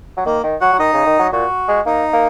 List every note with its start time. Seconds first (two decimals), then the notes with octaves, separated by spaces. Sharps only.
0.17 F#3
0.26 D#3 A#3
0.44 D#3
0.61 F#3 F#4 F#5
0.73 F#3
0.79 D#3 D#4 D#5
0.93 C#3
1.06 D#3
1.19 F#3
1.32 A#2 F#4
1.68 G#3
1.86 A#3 D#4
2.13 A#3